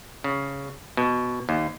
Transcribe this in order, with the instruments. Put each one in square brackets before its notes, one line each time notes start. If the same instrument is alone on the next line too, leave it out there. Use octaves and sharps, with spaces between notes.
[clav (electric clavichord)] C#3
B2
D#2